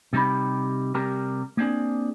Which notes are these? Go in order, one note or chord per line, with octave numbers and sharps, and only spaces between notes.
C3 G3 D#4 G4 B5
C3 G3 G4 A#4
A#3 C4 D4 G#4